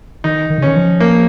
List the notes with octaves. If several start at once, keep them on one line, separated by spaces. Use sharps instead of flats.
D#3 D#4
D#3
C#3
D#3 C#4
F3
A#3